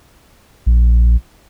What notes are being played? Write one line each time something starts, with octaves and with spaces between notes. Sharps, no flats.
A#1